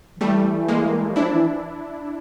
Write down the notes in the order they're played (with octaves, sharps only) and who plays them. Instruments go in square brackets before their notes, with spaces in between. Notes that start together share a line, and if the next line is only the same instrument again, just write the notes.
[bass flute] F3
[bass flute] E3 [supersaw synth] G3 A3
[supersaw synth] G#3 A#3
[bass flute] F#3
[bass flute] F3 [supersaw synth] D4 E4
[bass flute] E3